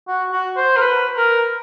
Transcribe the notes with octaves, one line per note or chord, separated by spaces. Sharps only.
F#4
F#4
C5
A#4
B4
A#4